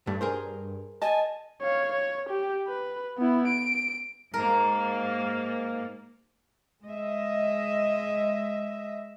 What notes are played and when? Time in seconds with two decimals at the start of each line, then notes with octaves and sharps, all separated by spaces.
0.07 G2 A3
0.21 G#4 A#4 C5
1.02 D#5 G#5 A5
1.62 C#5 F5
1.93 C#5
2.29 G4
2.68 B4
3.18 B3 E4
3.47 D7
4.34 G#2 A#3 A#4
6.86 G#3 D#5 E5